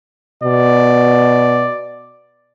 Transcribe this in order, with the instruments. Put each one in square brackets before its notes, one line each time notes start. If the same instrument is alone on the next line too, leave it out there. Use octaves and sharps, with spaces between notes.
[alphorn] B2 [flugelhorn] D5